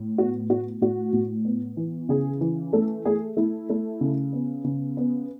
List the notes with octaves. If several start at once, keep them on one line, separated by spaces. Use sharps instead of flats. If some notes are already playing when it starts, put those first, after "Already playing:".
Already playing: A2
B3 F#4
A2 F#4
A2 F#4
A2
B3
E3
C#3 G#4
E3
A3 A4
A3 G#4
A3 E4
A3
C#3
B3
C#3
B3